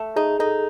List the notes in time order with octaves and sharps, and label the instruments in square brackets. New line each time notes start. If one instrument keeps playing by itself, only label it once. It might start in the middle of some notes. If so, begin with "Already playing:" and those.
Already playing: [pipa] A3
[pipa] D#4 [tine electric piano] G#4
[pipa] D#4 [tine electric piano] A4